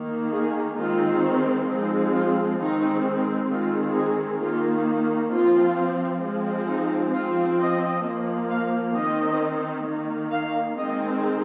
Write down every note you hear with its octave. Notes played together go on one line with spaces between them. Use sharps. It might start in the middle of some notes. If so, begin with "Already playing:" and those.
Already playing: D#3 A#3
G#4
D#3 G#3 C4 F4
F3 G#3 C4 D#4
F4
D#3 G#3 C4 D#4
D#3 G#3 C4 F4
G#4
D#3 A#3 F4
F3 C4 F4
F3 G#3 C4
D#4
F3 C4 F4
D#5
F3 A#3
F5
D#3 C4 D#5
D#3 A#3
F5
D#3 G#3 C4 D#5